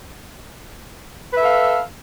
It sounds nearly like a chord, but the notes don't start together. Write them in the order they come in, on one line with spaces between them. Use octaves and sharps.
B4 E5 A4 F5